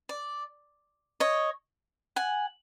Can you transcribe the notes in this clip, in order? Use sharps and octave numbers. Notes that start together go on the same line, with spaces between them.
D5
C#5 D#5
F#5 G#5